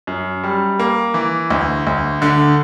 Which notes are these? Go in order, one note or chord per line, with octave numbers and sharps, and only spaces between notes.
F#2
G3
A#3
E3
D2
D2
D3